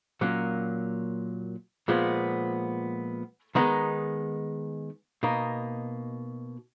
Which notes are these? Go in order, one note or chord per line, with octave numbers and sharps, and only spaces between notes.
A#2 F#3 A#3 C#4
A#2 F3 G#3 B3
D#3 G#3 B3 D#4
B2 A#3 D#4